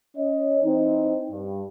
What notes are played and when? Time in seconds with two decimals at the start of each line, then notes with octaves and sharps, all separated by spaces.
0.17 C#4 C#5 D#5
0.63 E3 C4 D#4
1.31 G2